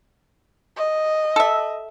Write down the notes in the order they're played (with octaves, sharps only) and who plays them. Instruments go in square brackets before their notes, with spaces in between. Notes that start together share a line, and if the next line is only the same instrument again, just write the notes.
[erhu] D#5
[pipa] A4 E5